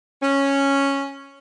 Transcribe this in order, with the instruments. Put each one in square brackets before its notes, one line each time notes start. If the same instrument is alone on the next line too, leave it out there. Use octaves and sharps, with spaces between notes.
[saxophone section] C#4